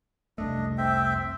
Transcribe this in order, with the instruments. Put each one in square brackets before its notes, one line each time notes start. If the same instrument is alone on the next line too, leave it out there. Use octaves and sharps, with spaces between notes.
[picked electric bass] C2 F2 A3 [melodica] D4 D#5
[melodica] C4 E5 G5